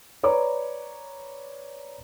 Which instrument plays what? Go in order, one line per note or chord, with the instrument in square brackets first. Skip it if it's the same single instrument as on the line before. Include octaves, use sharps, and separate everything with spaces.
[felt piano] B4 C#5 D5 A#5 D6